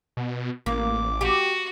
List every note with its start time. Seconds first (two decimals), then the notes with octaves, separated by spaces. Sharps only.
0.17 B2
0.66 A1 A#3 D6
1.21 F#4 G4